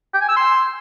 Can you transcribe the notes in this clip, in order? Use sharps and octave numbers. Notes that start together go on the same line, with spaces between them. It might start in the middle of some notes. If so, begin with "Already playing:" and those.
G5
G#5
E6
C6